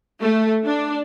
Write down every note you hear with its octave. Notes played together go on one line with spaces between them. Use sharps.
A3
D4